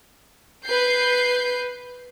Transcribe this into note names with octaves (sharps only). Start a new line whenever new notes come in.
B4 G6 C7